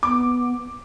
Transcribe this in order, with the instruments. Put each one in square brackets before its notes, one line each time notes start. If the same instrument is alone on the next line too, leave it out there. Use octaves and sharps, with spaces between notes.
[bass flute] B3 [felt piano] D6